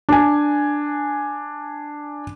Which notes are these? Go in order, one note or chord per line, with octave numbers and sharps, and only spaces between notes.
D4 G#5